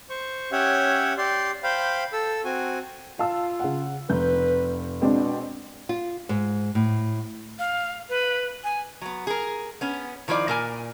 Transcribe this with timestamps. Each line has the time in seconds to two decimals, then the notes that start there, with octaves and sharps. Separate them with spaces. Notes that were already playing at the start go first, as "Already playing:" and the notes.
0.10 C5 C#6
0.52 C#4 G4 C#5 E5 F#5
1.18 G4 D5 C6
1.64 C5 F5 G5 B5
2.13 A4 E6
2.45 C4 F#4 G#5
3.19 F4 F5 A5 E6
3.60 C#3 F#5
4.10 F1 B4 G6
5.01 B2 G#3 C4 D4
5.89 F4
6.29 G#2
6.75 A2
7.59 F5
8.09 B4
8.64 G#5
9.01 F#3 B3
9.27 G#4 A#4
9.81 B3 C#4
10.28 D#3 F3 E4 F#4 D5
10.48 A#2 A#4 G#5